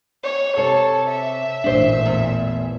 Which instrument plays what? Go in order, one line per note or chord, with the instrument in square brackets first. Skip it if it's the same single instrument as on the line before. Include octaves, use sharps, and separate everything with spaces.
[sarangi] C#5
[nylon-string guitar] C3 C#5 [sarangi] A4
[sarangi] E5
[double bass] A1 A#2 [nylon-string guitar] D4 C5
[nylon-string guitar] E2